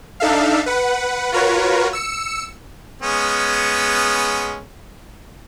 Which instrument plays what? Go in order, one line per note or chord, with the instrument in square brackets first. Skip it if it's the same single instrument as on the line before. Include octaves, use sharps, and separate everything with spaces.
[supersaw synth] D4 D#4 A4 E5 F5
B4 F#5
F4 F#4 A#4 B4 C#5
E6 C#7
[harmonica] G#3 B3 C#4